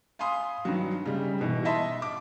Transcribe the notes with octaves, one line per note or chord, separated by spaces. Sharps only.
F5 G#5 B5 C6 D#6
G2 D#3 F#3
C#3 G3 G#3
G#2 B2 E3
D#5 E5 A5 B5 C6
D6